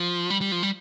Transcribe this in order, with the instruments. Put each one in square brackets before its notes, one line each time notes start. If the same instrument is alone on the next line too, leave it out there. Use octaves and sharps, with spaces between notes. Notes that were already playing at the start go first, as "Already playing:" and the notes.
Already playing: [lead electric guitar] F3
G3
G3
F3
G3